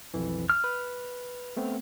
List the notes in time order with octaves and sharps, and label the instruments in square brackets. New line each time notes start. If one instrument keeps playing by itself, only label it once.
[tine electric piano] B1 F2 E3
[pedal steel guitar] F6
[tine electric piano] B4
A3 B3 C4